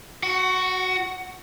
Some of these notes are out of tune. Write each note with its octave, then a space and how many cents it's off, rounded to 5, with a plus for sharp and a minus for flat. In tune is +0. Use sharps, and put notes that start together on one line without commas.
F#4 +0 F#5 +25